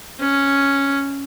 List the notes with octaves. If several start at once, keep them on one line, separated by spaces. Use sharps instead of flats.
C#4